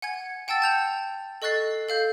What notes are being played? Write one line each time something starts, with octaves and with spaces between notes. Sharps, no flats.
F#5 G#5 G#6
F#5 G5 A5 E6 A6
A5 G6 F7
A4 D#5 C#6 F#6 A6 C7
A4 F5 G6